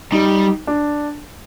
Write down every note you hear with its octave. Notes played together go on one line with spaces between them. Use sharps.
G3 D#4
D4